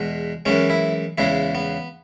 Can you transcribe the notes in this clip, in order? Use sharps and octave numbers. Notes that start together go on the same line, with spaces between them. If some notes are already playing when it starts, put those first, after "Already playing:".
Already playing: E2 B2 G#3
F#2 E3 G#3 C#4
E4
E2 C#3 G#3 E4
B3